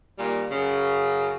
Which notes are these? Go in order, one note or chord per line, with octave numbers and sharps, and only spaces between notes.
A#2 D#3 G3
F#2 C#3